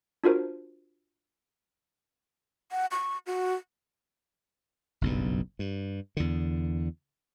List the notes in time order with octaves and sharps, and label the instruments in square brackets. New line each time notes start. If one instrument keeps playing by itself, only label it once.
[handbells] D4 F4 F#4 A#4 C5
[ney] F#5
C#6
F#4
[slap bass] F#1 B1 G2
G2
E2 D3